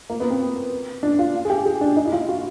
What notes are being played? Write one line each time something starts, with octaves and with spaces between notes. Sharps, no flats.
A#3
B3
C4
D4
F4
G#4
G4
G#4
D4
D#4
E4
F4
F#4